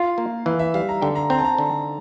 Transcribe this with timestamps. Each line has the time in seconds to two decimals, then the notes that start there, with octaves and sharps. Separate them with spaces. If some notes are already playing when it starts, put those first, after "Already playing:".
Already playing: F4 F5
0.18 A#3
0.46 E3 F5
0.59 E5
0.74 G3 F5
0.89 A#5
1.01 D3 G5
1.15 A#5
1.30 C4 A#5
1.38 A5
1.45 A#5
1.58 D3